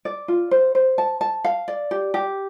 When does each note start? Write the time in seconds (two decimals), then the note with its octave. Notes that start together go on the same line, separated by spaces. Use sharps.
0.05 D5
0.28 F4
0.51 C5
0.75 C5
0.98 A5
1.21 A5
1.44 F5
1.68 D5
1.91 G4
2.14 G4